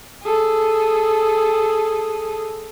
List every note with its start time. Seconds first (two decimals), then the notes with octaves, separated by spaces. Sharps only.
0.22 G#4 A4